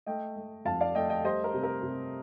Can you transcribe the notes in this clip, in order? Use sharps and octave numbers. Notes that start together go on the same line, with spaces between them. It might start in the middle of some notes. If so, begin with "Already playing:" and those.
A3 D#5 G5
A3
F2 F5 A5
D5 F5
A3 D#5 G5
D#5 G5
G3 C5 D#5
A#4
C3
A#4
C3